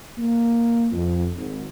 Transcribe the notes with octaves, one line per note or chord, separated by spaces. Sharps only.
A#3
F2
G#1